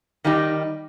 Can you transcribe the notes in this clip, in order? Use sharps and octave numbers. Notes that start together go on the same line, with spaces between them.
D#3 G3 D#4 G4